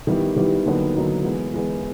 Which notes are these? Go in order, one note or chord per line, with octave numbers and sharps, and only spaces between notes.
D#3 G3 B3 E4 G4
D#3 G3 B3 E4 G4
D#2 D3 F#3 B3 D#4
D#2 D3 F#3 B3 D#4
E3 G#3 B3
E3 G#3 B3